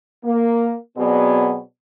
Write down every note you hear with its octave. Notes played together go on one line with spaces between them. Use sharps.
A#3
B2 F#3 B3 C4 G#4 D5